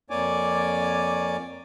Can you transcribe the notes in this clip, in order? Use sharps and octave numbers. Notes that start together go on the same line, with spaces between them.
F2 A#3 C#5 D5 G#5 D6